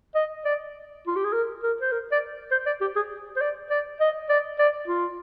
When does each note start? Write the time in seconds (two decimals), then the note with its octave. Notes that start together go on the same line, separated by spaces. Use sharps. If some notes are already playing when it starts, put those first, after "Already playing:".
0.15 D#5
0.45 D5
1.07 F4
1.16 G4
1.24 G#4
1.33 A#4
1.63 A#4
1.81 C5
1.92 A#4
2.12 D5
2.51 C5
2.66 D5
2.81 G4
2.96 G#4
3.36 C5
3.41 D5
3.70 D5
4.00 D#5
4.29 D5
4.59 D5
4.88 F4